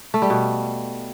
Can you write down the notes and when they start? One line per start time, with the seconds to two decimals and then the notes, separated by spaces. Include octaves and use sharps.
0.14 A3
0.22 G3
0.30 B2